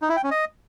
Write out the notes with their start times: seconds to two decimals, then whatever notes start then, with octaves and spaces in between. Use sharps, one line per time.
0.02 D#4
0.09 E4
0.17 G5
0.24 C#4
0.31 D#5